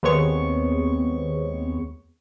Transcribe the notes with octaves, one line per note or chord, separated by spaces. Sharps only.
D#2 G#3 B3 C4 C#5 C#6